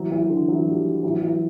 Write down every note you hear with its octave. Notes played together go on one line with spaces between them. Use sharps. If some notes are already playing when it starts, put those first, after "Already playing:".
Already playing: E3 F#3
E3 F#3
D3 E3
E3 F#3
F3 G3
E3 F#3
E3 F#3